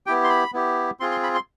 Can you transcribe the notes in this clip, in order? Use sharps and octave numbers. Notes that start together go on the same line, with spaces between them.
B3 E4 G4 G5
C6
B5
B3 E4 G4
C4 F4 G#4 C6
C6
B5
C6